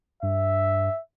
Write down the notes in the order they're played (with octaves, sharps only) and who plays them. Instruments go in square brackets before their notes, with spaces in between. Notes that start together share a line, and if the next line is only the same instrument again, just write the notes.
[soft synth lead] G2 [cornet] E5